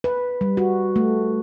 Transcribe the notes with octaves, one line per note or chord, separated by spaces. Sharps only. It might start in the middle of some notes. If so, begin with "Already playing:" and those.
B4
G3
F#4
A3